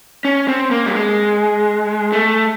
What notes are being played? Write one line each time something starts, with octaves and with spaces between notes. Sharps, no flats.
C#4
C4
A#3
G3
G#3
A3